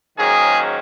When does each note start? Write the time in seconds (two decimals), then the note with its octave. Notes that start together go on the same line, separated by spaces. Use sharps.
0.17 G#2 D#3 F#3 A#3 C#4 G#4